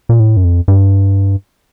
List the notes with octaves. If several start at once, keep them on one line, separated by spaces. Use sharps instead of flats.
A#2
A2
F#2
F2
G2